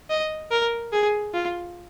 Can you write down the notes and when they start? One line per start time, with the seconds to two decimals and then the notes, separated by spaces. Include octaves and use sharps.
0.10 D#5
0.52 A#4
0.93 G#4
1.34 F4